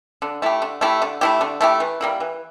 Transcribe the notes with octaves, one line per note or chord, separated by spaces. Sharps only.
D3
A3 E4 G4
D3
A3 E4 G4
D3
A3 E4 G4
D3
A3 E4 G4
E3
G3 A#3 E4
E3